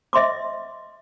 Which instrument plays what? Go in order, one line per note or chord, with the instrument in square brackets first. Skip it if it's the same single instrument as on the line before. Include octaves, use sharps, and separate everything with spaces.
[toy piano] D#5 E5 C6 D6